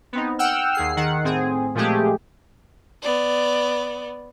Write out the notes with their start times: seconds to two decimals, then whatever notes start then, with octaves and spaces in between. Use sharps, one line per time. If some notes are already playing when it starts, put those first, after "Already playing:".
0.13 B3 C4 D#4
0.39 F#5 G5 E6 F6
0.75 D#2 G#4 C7
0.97 D#3 F#5
1.24 A2 C4 G#4
1.75 A#2 F3 G#3 A3 G4 G#4
3.02 B3 D5